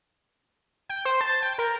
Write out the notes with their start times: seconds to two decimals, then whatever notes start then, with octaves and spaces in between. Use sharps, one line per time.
0.89 G5
1.05 C5
1.21 A5
1.42 G5
1.58 A#4